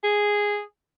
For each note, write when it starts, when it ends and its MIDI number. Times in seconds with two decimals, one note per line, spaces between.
0.04 0.61 68